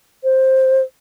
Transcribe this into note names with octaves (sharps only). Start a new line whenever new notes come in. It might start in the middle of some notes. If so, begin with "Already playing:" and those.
C5